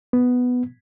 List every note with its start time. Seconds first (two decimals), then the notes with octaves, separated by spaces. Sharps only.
0.13 B3